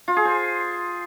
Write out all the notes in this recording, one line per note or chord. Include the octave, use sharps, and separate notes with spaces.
F4
G#4
C5